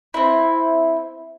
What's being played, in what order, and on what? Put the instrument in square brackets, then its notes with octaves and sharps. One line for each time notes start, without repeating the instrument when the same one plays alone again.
[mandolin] C4 E4